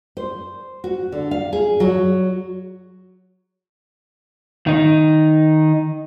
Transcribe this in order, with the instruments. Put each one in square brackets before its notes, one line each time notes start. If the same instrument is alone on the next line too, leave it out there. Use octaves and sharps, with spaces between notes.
[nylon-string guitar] C5
F#4
D3
F5
G#4
F#3
[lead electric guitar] D#3 D#4